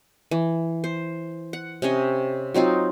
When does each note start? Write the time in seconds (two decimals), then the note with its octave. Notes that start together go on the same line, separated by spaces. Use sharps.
0.31 E3
0.84 C5
1.53 F#5
1.82 C3 C#4 C#5 D#5
2.54 F#3 C4 D#4 F4